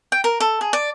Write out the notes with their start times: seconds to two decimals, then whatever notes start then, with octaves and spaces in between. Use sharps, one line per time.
0.12 G5
0.24 A#4
0.40 A4
0.61 G#4
0.73 D5